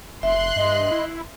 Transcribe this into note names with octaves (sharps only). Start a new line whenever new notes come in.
F1 E5 C6 F#6
G2 D#5
E4